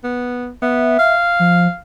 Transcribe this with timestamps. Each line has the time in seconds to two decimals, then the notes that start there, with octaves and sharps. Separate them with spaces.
0.04 B3
0.62 B3 E5
0.99 F5
1.39 F3